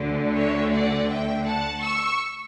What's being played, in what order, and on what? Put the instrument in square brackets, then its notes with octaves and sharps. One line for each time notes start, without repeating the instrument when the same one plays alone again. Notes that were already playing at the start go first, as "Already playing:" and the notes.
Already playing: [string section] D2 D3 A3
C#5 E5
D5 F#5
E5 G5
F#5 A5
C#6 E6